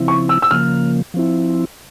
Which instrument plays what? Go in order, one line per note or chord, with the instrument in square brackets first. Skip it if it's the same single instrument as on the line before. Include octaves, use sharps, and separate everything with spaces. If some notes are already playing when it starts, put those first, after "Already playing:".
Already playing: [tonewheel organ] C#3 F3 C4 E4
[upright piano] C#6
E6
E6
[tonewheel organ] C#3 F3 A#3 [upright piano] F6
[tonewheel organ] F3 C4 E4